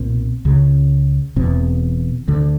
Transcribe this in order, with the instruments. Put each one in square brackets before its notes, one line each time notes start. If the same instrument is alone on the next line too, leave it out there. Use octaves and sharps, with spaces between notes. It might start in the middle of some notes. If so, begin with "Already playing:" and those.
Already playing: [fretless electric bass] B1 A#2 C4
C#2 C#3
E1 E2 B2 C4
D2 D3